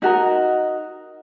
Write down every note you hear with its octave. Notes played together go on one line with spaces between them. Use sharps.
D#4 F#4 A#4 D#5